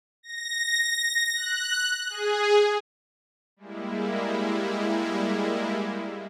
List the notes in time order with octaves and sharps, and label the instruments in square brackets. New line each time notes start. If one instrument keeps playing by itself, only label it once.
[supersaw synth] A#6
F#6
G#4
G3 G#3 A#3 E4